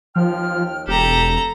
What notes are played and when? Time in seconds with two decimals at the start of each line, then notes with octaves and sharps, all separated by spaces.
0.16 D#2 F3 G5 F6
0.88 E1 G4 A4 A#5